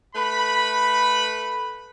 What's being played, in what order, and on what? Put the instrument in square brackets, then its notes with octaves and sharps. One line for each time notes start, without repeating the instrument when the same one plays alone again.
[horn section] A3 B4 B5